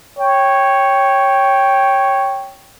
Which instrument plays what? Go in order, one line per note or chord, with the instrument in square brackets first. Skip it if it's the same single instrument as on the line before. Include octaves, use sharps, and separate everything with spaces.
[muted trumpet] C#5 [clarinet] G5